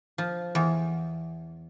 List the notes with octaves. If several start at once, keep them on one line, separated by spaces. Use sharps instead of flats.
F3
E2